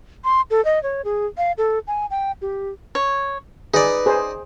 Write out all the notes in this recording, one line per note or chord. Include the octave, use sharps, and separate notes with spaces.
C6
A4
D#5
C#5
G#4
F5
A4
G#5
G5
G4
C#5
D#4 G#4 B4 D5
G#4 C5